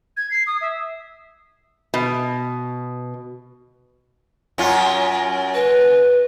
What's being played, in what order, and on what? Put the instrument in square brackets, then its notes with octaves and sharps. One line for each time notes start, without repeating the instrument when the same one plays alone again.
[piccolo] G#6
C7
D#6
E5
[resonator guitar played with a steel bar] B2
[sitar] F#2 C#4 F4
[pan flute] B4